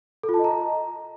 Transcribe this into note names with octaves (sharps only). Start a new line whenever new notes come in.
A4
F4
A5
D#5
A#5